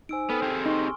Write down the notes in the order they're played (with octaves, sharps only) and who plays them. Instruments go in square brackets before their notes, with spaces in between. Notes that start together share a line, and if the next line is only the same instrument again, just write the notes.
[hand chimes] D#4 C5 [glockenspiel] G#5 E6 D7
[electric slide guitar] B3 [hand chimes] A4 G5 [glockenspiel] F6
[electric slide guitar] C4 G4 G#4
[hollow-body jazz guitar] D#4 [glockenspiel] C6 C#6